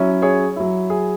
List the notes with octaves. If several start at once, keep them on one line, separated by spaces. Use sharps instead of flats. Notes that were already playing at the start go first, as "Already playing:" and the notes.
Already playing: F#3 C#4 E4
G#4 C#5
F#3 E4
G#4